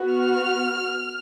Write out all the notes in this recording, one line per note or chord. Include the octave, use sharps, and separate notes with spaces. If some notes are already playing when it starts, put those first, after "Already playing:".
Already playing: B3 F#4
F6